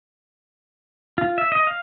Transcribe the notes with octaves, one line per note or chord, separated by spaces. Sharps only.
F4
E5
D#5
F5